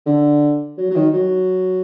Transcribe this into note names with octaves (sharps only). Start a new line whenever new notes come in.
D3
F#3
F#3
D#3
F#3